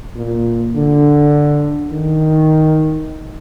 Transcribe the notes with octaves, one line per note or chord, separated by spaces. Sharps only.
A#2
D3
D#3